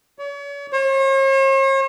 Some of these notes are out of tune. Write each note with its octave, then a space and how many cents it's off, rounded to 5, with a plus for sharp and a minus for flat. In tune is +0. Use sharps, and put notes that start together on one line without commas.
C#5 +40
C#5 -45